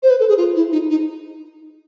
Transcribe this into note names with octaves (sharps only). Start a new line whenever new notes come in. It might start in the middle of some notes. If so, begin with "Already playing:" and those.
C5
B4
A4
G#4
F4
E4
D#4
D#4